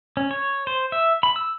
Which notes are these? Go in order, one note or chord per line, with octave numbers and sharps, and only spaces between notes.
C#4
C#5
C5
E5
B5
E6